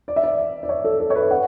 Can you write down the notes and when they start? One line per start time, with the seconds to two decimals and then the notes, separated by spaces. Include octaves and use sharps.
0.08 D5
0.16 E5
0.24 D5
0.63 D5
0.69 C#5
0.84 A4
1.00 A4
1.10 C#5
1.15 B4
1.31 F#5